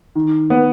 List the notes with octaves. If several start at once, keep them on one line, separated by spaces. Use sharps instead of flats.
D#3
B3